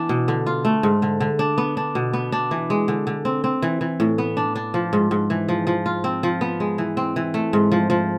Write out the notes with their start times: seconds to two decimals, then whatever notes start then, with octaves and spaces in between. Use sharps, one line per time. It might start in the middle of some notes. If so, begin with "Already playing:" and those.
Already playing: E3 B3 D4 E4
0.09 B2
0.28 D3
0.47 F4
0.65 A3
0.83 G#2
1.02 D3
1.20 D3
1.39 D4
1.58 B3
1.77 D4
1.95 B2
2.13 B3
2.32 D4
2.51 E3
2.70 G#3
2.88 D3
3.07 D3
3.25 C4
3.44 C4
3.62 E3
3.81 E3
4.00 A2
4.18 B3
4.37 D4
4.56 D4
4.74 F3
4.93 G#2
5.11 G#2
5.30 E3
5.49 F3
5.67 F3
5.86 F4
6.04 C4
6.23 F3
6.41 B3
6.60 G#3
6.78 E3
6.97 C4
7.16 E3
7.34 A3
7.53 G#2
7.72 F3
7.90 F3